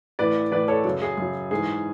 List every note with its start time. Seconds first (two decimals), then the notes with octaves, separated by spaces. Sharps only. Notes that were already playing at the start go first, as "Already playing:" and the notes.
0.19 A2 E3 B4 D5
0.51 A2 E3 B4 D5
0.68 A4 C#5
0.85 F#2 C#3 F#3
1.02 G#4
1.17 F#2 C#3 F#3
1.51 G#2 E3 G#4